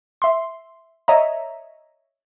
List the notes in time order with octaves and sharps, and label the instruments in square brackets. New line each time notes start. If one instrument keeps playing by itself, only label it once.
[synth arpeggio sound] E5 C6
C#5 D#5 E5 A#5